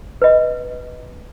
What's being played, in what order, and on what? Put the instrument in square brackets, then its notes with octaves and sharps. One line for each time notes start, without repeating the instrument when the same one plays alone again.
[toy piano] B4 D#5